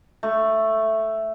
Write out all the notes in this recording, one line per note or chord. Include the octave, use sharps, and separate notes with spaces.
A3